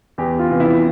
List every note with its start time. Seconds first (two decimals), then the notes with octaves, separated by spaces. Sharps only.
0.18 E2 G4
0.39 F4
0.49 C3 E3
0.60 E4